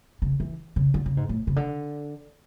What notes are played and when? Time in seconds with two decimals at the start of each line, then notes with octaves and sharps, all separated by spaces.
0.22 C#3
0.40 E3
0.76 C#3
0.94 D3
1.06 C#3
1.17 G#2
1.29 A2
1.47 C#3
1.56 D3